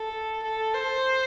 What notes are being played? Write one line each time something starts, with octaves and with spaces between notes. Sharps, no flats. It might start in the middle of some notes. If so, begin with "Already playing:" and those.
Already playing: A4
A4
C5